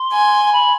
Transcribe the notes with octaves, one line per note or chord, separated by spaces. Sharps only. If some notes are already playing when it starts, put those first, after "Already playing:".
Already playing: C6
G#5
B5